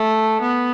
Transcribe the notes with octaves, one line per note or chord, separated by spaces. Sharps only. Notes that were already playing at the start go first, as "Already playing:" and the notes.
Already playing: A3
B3